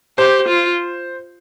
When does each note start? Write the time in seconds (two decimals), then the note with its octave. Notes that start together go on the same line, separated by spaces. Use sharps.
0.18 G4 C5
0.48 F4